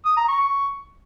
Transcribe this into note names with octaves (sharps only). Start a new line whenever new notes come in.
D#6
A#5
C#6